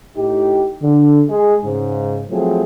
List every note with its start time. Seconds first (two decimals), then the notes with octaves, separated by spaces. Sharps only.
0.17 A2 D#4 G4
0.82 D3
1.29 G#3 G#4
1.64 G#2 C#3
2.30 F3 F#3 A3 C4 G#4